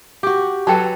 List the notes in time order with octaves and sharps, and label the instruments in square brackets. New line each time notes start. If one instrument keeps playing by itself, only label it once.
[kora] F#4 G4
[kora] F#3 A4 B4 [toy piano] G5 A5